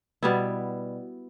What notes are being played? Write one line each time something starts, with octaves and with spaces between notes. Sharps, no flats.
B2 G3 B3 E4